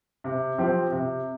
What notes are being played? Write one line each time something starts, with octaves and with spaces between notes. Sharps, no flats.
C3
F3 C4 G4
C3